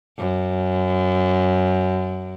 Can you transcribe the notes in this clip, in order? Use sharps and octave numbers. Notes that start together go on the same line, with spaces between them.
F#2